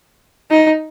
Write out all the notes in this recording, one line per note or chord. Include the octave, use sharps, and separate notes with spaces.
D#4